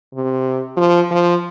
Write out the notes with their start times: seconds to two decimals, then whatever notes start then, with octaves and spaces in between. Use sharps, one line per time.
0.15 C3
0.77 F3
1.11 F3